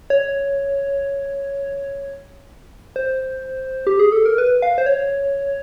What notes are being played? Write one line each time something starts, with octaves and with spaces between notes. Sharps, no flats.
C#5
C5
G4
G#4
A4
A#4
B4
F5
C5
C#5